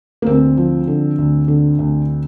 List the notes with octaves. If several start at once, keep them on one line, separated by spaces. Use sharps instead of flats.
A#3
D2 C4
F3
D3
D2
D3
D2